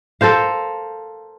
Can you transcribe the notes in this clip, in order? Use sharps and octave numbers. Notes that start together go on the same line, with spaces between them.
A4 A#4 C5 F5